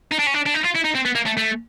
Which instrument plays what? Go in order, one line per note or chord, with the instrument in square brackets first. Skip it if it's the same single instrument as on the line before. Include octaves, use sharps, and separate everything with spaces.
[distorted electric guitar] D#4
D4
C#4
D4
D4
D#4
F4
E4
D#4
C4
B3
A#3
A3
A3